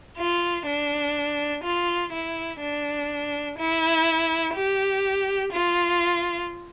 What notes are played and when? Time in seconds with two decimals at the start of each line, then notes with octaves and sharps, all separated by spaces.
0.18 F4
0.66 D4
1.64 F4
2.12 E4
2.60 D4
3.58 E4
4.55 G4
5.52 F4